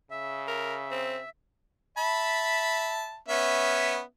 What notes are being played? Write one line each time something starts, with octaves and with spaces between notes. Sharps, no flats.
C#3 E5
A#4 E5
C4
E5 A5 B5
B3 C#4 E5